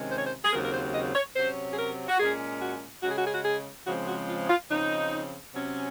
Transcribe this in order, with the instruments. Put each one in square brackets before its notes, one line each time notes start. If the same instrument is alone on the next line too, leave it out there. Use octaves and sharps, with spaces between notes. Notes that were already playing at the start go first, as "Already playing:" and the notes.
Already playing: [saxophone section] C3 D#3 G#3 C#4
C5
C#5
C5
G#4
D#2 C#3 F#3 C4 A#4
A#4
C5
D#5
C#5
C3 F#3 C#4 C5
G#4
A#4
F#4
A#2 G#3 C#4 G#4
F#4
C#3 G#3 C#4 F#4
G#4
F#4
G#4
F#4
G#4
C#3 F3 G#3 C4 F#4
F#4
F4
F4
C#3 F3 C4 D#4
C3 F#3 C#4